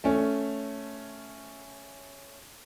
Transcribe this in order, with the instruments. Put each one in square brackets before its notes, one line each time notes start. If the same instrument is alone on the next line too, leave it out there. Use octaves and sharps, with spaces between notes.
[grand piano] A3 C#4